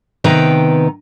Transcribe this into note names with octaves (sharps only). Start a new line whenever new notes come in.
C3 D#3 B3 B4 G5 A#5